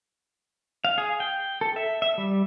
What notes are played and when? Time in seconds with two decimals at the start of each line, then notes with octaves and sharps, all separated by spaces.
0.85 F5
0.98 G#4
1.20 G5
1.61 A4
1.76 E5
2.02 E5
2.18 G3